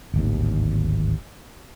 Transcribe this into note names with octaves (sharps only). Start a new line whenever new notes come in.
D1 G#1 D#2